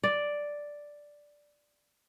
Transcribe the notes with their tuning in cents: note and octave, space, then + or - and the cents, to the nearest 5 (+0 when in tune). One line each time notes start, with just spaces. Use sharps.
D5 +0